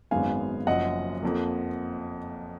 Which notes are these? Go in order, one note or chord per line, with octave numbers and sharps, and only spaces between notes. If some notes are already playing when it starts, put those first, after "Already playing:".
G#1 F#2 D#3 G#3 B3 F5 G#5
F#1 F#2 F3 D#5 F#5
F2 F3 A#3